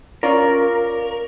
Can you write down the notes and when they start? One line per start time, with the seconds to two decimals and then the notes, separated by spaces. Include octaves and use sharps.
0.23 C#4 F4 A#4 D5